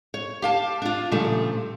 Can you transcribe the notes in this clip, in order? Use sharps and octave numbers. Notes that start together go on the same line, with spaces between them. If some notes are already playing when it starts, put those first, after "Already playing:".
C#5
G4 F5 A5
D4 F4
A#2 C#3 F3 G3 A3